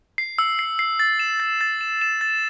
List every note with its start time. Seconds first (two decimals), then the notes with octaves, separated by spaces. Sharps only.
0.18 C7
0.38 E6
0.59 C7
0.79 C7
1.00 A6
1.20 E7
1.40 A6
1.61 A6
1.81 E7
2.01 E7
2.21 A6